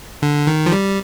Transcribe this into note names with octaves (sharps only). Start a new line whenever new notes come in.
D3
D#3
F3
G3